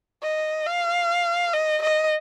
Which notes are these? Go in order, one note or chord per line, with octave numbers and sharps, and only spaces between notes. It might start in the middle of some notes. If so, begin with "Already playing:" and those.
D#5
F5
D#5
D#5